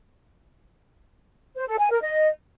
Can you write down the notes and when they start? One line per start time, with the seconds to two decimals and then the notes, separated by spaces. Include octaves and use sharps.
1.56 C5
1.67 A4
1.79 G#5
1.90 A#4
2.02 D#5